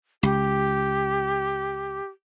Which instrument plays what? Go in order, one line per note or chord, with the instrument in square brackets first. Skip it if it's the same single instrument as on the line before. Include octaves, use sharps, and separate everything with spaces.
[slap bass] C#2 [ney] G4